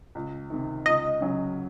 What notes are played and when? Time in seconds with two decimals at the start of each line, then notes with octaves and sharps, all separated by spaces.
0.15 C#2
0.50 C3 D#3
0.86 C#2 D#5
1.21 C#3 F#3